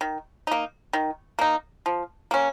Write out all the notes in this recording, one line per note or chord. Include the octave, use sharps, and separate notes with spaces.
D#3
A#3 D#4
D#3
A#3 D#4
F3
A#3 C#4